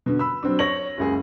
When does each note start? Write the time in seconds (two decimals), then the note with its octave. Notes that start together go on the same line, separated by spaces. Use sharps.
0.06 B2 D3
0.19 B5 E6
0.43 F#3 C4 D4
0.59 C#5 A#6 F#7
0.98 F#1 C#2 G#4